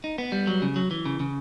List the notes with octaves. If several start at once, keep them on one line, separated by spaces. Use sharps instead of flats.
D#4
B3
G3
F#3
C#3
F#3
E3
C#3
C#3